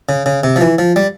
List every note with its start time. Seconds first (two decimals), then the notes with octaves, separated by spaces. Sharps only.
0.09 C#3
0.26 C#3
0.44 C3
0.56 F3
0.61 E3
0.79 F3
0.96 G3